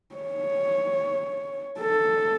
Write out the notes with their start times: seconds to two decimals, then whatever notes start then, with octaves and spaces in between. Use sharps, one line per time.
0.16 C#5
1.80 A4